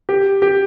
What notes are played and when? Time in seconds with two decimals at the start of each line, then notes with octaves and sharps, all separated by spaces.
0.09 G4
0.42 G4